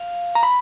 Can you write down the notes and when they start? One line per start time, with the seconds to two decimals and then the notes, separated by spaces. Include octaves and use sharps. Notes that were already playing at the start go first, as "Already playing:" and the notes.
Already playing: F5
0.35 A#5
0.43 B5